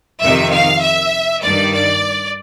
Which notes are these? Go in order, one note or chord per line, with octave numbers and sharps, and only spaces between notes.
F2 C3 D#3 E5
F5
E5
G2 D#3 D5
D5